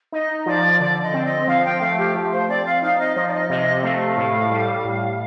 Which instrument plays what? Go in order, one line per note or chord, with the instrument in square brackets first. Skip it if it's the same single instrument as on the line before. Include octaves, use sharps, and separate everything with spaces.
[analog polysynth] D#4 [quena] D#5
[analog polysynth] F3 [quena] D5
[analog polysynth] D3 [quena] D5
[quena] D#5
[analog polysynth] C4
[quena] D#5
[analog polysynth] F3 [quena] F5
[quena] G5
[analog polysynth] A3 [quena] F5
[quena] G4
[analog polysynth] F3
[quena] C5
[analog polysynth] C4 [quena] D5
[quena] F5
[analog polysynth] D#4 [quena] F5
[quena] D#5
[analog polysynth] F3 [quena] D#5
[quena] D5
D#5
[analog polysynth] C3 [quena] D#5
[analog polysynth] A3 [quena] F5
[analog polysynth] A2
G3
A2